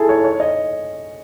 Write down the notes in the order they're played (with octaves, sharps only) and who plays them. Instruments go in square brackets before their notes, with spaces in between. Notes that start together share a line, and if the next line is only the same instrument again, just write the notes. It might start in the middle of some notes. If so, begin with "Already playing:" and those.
Already playing: [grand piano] E4 G#4 A4
C#5
C#5
D#5